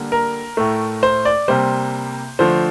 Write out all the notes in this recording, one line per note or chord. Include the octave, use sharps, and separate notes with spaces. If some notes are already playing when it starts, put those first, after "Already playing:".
Already playing: D3 G3 A#3
A#4
A2 A3
C5
D5
C3 G3 A#3 C5
D3 F3 A3 C5